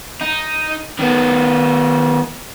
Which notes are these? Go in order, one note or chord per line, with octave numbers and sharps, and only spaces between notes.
D#4
D#3 B3